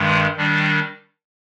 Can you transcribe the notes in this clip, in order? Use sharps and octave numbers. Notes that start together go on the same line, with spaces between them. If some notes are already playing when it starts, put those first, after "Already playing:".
Already playing: G2 D#3 G#3
D#3 G3 D4